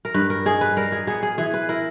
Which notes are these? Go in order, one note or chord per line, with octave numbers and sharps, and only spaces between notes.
A#4
G2 B4
A#4
D#4 G#4
B4
G3 A#4
G#4
B3 G#4
G#4
E3 G#4
B4
E4 A#4